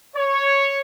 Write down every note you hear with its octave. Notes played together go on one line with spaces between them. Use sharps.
C#5